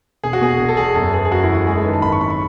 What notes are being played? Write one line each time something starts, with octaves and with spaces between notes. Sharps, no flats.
E1 G#4
F#4
B2 G#4
E1
A4
E2 G#4
F#2 A4
B3 G#4
G#4
F#2 F#4
E4
E3
F#4
G#3 G#4
A4
D#3 B4
A5
G#1 B5
C#6
F#2 B5
C#6